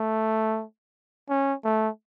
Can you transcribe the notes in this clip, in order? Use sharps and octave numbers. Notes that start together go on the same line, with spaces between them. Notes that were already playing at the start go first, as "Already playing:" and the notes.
Already playing: A3
C#4
A3